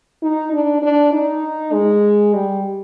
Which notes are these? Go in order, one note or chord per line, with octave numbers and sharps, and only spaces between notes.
D#4
D4
D4
D#4
G#3
G3